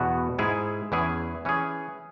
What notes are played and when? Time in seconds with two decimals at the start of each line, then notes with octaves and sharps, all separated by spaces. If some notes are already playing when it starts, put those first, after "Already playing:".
Already playing: E2 B2 B3 F#4
0.39 G#2 G#3 E4 G#4
0.92 E2 E3 C#4 E4 G#4
1.45 E3 C#4 G#4